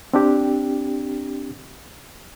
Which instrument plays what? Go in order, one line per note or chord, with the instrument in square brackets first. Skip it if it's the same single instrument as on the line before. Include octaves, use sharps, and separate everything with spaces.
[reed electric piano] C4 D4 G4